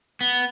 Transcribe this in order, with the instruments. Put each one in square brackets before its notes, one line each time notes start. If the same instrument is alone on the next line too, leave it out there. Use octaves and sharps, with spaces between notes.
[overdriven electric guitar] B3